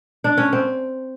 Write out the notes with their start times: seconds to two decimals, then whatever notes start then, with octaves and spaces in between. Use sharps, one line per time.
0.24 D4
0.37 C#4
0.53 C4